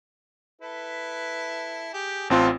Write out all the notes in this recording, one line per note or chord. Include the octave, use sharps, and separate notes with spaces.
E4 A4 B4
G4 G#4
A1 C4 F4 A4 F#5 A5